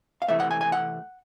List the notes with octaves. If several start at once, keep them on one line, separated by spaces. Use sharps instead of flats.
F5
C3 E3 A3 E5
F#5
G#5
G#5
F#5